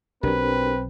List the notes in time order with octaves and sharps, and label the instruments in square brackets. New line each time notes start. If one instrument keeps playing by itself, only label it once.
[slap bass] B1 F#3 [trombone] C4 [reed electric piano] D4 G4 A#4 [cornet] B4